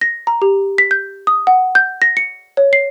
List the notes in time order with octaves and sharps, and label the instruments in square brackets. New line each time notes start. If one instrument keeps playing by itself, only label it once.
[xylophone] A#6
A#5
G4
B6
G6
D#6
F#5
G6
A#6
C#7
C#5
C7